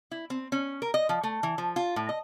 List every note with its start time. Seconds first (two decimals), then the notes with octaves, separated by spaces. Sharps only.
0.11 E4
0.30 C4
0.52 C#4
0.82 A#4
0.94 D#5
1.09 F3
1.23 A3
1.43 E3
1.58 F3
1.76 F4
1.96 A2
2.09 D#5